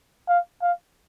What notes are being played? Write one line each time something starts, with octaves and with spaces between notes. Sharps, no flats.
F5
F5